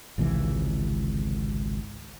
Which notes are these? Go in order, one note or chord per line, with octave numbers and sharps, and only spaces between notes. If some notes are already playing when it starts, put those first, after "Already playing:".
G#1 C#2 C3 E3